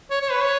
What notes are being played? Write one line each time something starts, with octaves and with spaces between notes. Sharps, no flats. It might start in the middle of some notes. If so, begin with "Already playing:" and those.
C#5
C#5
B4
C#5